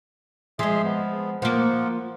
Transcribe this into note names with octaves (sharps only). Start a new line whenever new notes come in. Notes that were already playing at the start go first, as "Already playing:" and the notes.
F3 G#3 G#4 E5 C6
B3
F3 A#3 F4 F#5